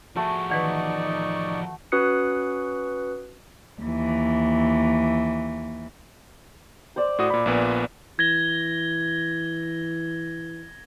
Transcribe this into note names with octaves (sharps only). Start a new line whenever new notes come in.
F3 A3 F#4 G#4
D#3 E3 D#4 B4 D5 F#5 C#6
C#4 F#4 B4 D#6 F#6 C#7
D#2 E3
C5 D5
A2 F#4 D#6
A#2 B5
A#1 A#2 B3
E3 G#6 A#6 G7